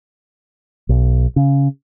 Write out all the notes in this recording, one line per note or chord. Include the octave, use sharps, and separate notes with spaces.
B1
C#3